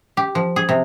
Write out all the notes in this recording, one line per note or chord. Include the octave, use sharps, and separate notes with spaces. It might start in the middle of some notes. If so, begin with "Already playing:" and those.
G4
F3
G#4
C3